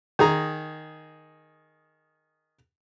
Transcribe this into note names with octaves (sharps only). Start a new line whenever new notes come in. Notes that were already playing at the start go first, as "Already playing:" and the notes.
D#3 G#4 A#5